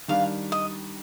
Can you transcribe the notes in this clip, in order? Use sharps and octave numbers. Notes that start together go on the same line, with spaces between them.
D#3 G3 D4 F5
D#5